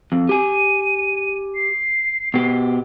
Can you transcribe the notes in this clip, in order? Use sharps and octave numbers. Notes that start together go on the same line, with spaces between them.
F2
G4 G#5 D#7
C7
B2 G4